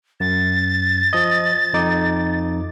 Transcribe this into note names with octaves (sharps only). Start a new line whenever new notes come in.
F#2 A6
F3 D#5
F2 D#4 D6